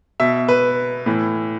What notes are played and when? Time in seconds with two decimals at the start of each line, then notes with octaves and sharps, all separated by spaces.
0.20 B2 E5
0.48 B4
1.06 A2 E3